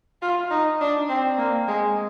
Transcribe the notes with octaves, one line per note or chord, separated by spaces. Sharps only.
F4
D#4
D4
C4
A#3
G#3